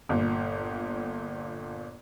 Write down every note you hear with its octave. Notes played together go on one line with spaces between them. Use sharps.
G1 A#2